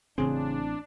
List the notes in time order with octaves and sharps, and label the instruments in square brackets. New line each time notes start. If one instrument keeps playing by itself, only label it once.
[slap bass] A1 C4 [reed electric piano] C#3 G#4 C5 [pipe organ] D4